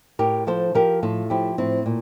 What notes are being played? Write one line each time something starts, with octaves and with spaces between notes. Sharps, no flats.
A2 G4 A#4
F3 A4 C5
F3 G4 A#4
A2 F4 A4
F3 E4 G4
A2 C4 E4
A#2